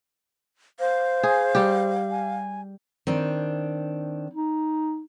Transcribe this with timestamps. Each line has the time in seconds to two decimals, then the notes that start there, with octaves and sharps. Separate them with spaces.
0.80 C5 F5
1.23 G#4
1.55 G3 G4
2.11 G#5
3.07 D#3 C4 D4
4.33 D#4